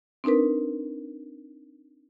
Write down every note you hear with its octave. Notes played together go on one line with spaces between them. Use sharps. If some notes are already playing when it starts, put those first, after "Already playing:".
C4 D4 D#4 A#4 B4